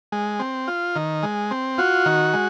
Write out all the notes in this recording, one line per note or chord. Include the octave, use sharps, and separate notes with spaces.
G#3
C4
F4
D#3
G#3
C4
F4 F#4
D#3
G#3